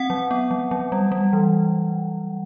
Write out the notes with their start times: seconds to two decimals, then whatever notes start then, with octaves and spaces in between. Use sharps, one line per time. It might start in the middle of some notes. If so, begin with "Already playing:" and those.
Already playing: C4 F#5
0.10 F#3
0.31 B3
0.51 F#3
0.71 F#3
0.92 G3
1.12 G3
1.33 E3